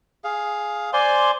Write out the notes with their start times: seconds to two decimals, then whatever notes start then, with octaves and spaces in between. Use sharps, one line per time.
0.24 G#4 F5
0.93 C5 D5 G#5 C6